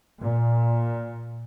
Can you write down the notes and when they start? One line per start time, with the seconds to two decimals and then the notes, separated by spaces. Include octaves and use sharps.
0.20 A#2